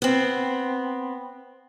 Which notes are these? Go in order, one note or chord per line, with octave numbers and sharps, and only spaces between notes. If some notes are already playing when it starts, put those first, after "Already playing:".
B3 C4